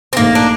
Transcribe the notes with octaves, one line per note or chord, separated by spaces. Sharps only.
C4
A#1 A#2 A3 A#3 D#4
D4